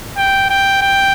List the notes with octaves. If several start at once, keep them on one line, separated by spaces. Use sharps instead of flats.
G5
G5
G5